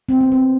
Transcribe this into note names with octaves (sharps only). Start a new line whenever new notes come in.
C4
B3
C4